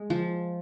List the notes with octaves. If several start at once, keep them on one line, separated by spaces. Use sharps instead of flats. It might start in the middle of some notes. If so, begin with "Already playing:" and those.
Already playing: G#3
F3